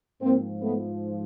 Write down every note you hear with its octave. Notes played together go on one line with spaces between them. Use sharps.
G#2 F3 A#3 C4
A3 B3